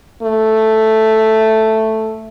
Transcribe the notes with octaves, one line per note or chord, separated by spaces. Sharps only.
A3